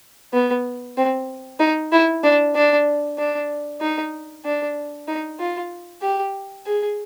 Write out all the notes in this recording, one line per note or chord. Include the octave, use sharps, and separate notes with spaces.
B3
C4
D#4
E4
D4
D4
D4
D#4
D4
D#4
F4
G4
G#4